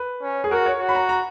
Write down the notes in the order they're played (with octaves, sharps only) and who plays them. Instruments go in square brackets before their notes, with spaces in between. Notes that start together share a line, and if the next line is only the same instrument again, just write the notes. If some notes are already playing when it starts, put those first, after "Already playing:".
Already playing: [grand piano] B4
[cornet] C#4
[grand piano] G#4
[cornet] F#4 [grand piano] A#4
[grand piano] C#5
[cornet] F#4
[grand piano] B5
A#5
A#5